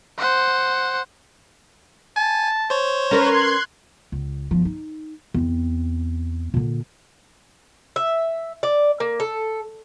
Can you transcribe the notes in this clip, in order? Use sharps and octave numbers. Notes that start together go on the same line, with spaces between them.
C5 F#5
G#5 A5
C5 C#5
C#4 A#4 B4 A#5 C6 F#6 G#6
C#2
G1 F3
D#4
E2 C4
A#2 D3
E5
D5
A#3
A4